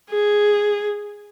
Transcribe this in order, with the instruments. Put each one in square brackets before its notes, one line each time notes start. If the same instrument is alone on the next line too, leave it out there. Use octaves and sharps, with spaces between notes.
[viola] G#4